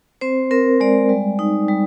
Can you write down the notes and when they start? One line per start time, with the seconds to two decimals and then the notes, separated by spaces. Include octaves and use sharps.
0.21 C4 C5
0.51 C4 A#4
0.80 G#3 D5
1.09 G3
1.39 D#4
1.69 G3